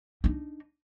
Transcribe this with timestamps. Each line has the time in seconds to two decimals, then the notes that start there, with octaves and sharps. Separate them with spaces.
0.24 D4 D#4